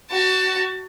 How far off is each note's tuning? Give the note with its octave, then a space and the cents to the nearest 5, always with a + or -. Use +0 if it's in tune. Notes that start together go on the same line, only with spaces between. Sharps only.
F#4 +20 A5 +25